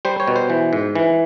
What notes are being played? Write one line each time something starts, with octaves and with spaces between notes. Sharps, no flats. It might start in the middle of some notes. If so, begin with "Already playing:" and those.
G3 C5
C#5
B2
C5
E3
G#2
E3